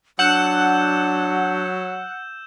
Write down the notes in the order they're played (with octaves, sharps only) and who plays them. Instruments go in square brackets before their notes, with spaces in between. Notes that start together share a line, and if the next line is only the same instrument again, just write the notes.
[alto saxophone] F#3 [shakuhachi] D4 [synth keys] F#5 [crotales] E6 G6 E7